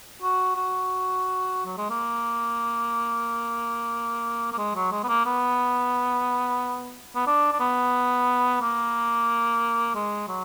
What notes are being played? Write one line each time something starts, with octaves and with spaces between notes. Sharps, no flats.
F#4
F#4
F#3
G#3
A#3
A#3
G#3
F#3
G#3
B3
A#3
B3
B3
D4
D4
B3
A#3
G#3
F#3